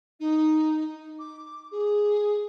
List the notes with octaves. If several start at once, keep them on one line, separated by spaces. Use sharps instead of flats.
D#4
D6
G#4